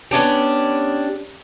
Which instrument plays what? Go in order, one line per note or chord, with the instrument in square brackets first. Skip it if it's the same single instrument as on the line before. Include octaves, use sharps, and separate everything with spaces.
[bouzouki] B3 C#4 D4 G4